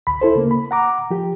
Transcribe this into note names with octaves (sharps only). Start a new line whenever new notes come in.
D2 B5
E4 A4 C5
C#3 A#3
B5
F#5 A#5 D6
F3 G4